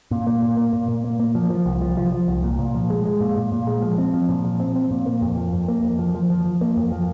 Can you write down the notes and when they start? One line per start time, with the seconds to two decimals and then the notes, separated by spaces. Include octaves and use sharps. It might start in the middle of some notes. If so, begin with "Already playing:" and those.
0.11 A#2
0.27 A#3
0.42 A#2
0.57 A#3
0.73 A#2
0.88 A#2
1.04 A#3
1.20 A#3
1.35 F3
1.50 F3
1.66 C2
1.81 F3
1.97 F3
2.12 F3
2.28 C2
2.43 A#2
2.59 A#2
2.74 F3
2.90 G#3
3.05 G#3
3.21 A#2
3.36 A#2
3.52 A#2
3.67 G#3
3.82 F3
3.98 C4
4.14 F3
4.29 A#2
4.45 F3
4.60 C4
4.75 C4
4.91 A#2
5.06 A#3
5.22 F2
5.37 F3
5.53 F2
5.68 A#3
5.83 F2
5.99 F3
6.15 F3
6.30 F3
6.45 F3
6.61 A#3
6.77 F2
6.92 F3